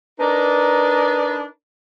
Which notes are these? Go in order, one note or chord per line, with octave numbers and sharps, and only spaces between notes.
D4 D#4 A#4 B4 D5